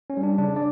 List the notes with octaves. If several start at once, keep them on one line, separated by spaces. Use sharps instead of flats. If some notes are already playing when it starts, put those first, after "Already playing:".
C#4
G3
D4
C#3 D4
D5